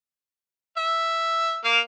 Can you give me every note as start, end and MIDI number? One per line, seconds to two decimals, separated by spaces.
0.77 1.58 76
1.65 1.79 58
1.65 1.79 77